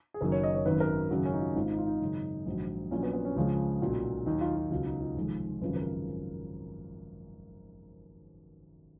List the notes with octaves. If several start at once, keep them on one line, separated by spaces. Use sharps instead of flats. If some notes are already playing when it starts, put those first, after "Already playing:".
G#4
F#1 F#2 D#3 F#3 A#4
C#5
D#5
C#5
G#1 F#2 D#3 B4
A#4
G#1 F#2 C#3 F#4
C#4
D#4
F4
G#1 G#2 D#3 G#3 F4
D#4
F4
D#4
G#1 F#2 C#3 F#3
A#1 G#2 D#3 F#3
A#1 A#2 F#3 C#4
B3
B3
C#4
C#2 C#3 F3 G#3
B1 A#2 F#3
D#2 D#3 F#3 D#4
F4
F4
C#2 B2 F#3 F4
D#4
F4
F1 F2 D#3 G#3
G#1 F#2 C#3 F3 G#3 B4
A#4